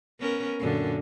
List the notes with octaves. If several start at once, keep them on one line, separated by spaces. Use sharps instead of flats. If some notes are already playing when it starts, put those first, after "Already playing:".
B3 C#4 A#4
F#2 A#2 D3